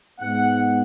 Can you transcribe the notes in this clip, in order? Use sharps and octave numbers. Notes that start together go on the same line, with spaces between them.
G#2 G#3 B3 F#5